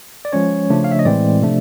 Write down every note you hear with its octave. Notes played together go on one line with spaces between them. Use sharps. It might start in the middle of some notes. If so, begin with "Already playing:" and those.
D5
F3 G#3 C#4 C#5
C#3 F3 A3 D4
F5
E5
D#5
A2 E3 G#3 C4 D5
C3 F3 A3 D4